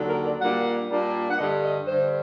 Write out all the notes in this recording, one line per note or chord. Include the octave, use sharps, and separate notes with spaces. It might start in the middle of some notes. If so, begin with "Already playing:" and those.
Already playing: D#2 D3 F#3
A#4
D5
A#2 G3 A#3 D4 F#5
A#2 G3 A#3 D4
F#5
G2 D3 G3 D4 D#5
D#5
G2 D3 G3 D4 C5